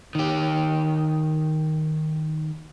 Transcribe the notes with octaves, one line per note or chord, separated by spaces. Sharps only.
D#3 G4